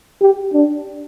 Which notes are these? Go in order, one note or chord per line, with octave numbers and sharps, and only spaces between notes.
G4
D4